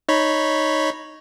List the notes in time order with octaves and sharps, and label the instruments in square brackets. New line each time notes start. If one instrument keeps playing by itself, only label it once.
[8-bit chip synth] D#4 C#5 B5